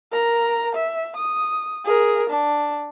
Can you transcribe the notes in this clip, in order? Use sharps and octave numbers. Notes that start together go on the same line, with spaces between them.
A#4 A#5
E5
D#6
G#4 A#4
D4